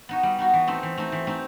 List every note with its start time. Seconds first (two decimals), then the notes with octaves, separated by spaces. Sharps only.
0.09 B3 D#4 F#4
0.23 G3
0.38 B3 D#4 F#4
0.53 E3
0.67 A3 C4 D#4
0.83 E3
0.97 A3 C4 D#4
1.12 E3
1.27 A3 C4 D#4